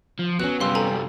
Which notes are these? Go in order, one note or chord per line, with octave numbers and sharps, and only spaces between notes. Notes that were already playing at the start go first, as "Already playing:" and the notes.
F3
F#3 B3 C#4 F#6
F#2 C3 G3 F5 C6 E6
A4 G#5 A#5